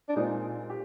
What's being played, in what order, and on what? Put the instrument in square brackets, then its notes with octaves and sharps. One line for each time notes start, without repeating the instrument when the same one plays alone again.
[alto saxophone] D4
[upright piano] A#2 G#3 C4 F4 [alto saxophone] D#4
[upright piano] G4